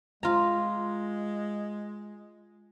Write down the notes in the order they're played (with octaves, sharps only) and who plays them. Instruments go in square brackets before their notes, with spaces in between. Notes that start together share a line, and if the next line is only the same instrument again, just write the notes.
[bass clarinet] G#3 [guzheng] F4 A#5